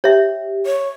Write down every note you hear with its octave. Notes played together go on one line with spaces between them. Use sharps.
G4 C#5 E5
C#5